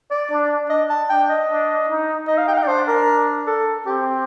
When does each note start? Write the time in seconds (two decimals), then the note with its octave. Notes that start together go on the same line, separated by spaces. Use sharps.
0.10 D5
0.30 D4
0.70 D4 D#5
0.90 A5
1.09 D4 G5
1.29 D#5
1.49 D4
1.88 D#4
2.27 D#4 D#5
2.38 F5
2.48 G5
2.54 F5
2.58 G5
2.63 D5
2.67 D4 C5
2.88 A#4
3.47 A4
3.86 C4 G4